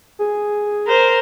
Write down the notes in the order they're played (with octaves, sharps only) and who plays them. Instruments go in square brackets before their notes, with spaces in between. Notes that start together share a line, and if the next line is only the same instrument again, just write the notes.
[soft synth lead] G#4
[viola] A#4 C5